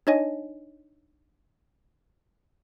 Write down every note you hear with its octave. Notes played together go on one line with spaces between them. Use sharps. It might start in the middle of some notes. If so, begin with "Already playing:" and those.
D4 D#4 C#5 D#5 G#5